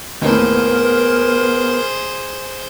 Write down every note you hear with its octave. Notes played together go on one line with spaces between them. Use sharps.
D#2 A2 B3 G#4 A#4 C5